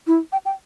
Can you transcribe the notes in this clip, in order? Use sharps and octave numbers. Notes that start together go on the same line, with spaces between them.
E4
G5
G5